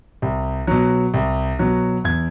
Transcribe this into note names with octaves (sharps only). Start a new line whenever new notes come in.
C2
B2 F#3
C2
B2 F#3
E2 G#6